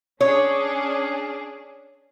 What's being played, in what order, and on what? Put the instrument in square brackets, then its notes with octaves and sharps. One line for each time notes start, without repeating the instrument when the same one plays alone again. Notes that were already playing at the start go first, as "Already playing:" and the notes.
[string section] C#4 D4 G#4 [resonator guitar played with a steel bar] C#5